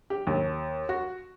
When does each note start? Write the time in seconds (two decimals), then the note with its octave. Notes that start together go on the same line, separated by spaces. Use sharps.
0.10 G4
0.27 D#2
0.89 F#4